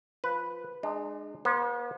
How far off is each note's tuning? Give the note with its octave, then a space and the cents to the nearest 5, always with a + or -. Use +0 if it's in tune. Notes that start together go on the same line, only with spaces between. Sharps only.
F3 +0 B4 +0
G#3 +0 D4 +40
B3 -45 C5 +0